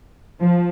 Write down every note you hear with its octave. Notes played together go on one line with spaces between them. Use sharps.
F3